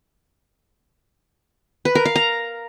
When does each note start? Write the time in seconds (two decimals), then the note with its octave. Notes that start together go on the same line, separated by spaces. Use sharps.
1.85 B4
1.95 A#4
2.05 F5
2.16 A#5